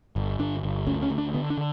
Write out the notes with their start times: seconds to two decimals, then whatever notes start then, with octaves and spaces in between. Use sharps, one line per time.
0.16 G1
0.39 G1 D4
0.63 G1
0.87 D2 C#4
1.02 C#4
1.10 D2
1.18 D4
1.34 D3 B3
1.50 D4
1.57 D3